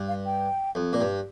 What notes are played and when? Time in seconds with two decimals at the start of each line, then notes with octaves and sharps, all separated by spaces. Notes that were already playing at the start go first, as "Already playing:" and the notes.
Already playing: G2
0.08 F5
0.26 G5
0.75 F2
0.93 A#2
1.01 G2